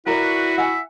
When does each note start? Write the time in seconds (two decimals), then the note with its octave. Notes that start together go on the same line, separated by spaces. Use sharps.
0.07 E4 F#4 A#4 B4 D5
0.58 E5 F#5 G#5